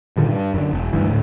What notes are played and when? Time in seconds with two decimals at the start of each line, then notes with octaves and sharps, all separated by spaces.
0.17 G2 A#2 D3 D#3
0.28 G2
0.54 F#2 D3
0.71 E1
0.93 D2 G2 E3
1.08 D2 A2